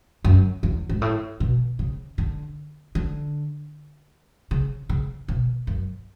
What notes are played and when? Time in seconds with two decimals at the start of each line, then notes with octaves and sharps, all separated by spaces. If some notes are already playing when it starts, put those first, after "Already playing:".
0.24 F#2
0.63 E2
0.89 G#2
1.02 A2
1.40 B2
1.79 C#3
2.18 D3
2.95 D3
4.51 C#3
4.89 C#3
5.28 B2
5.67 F#2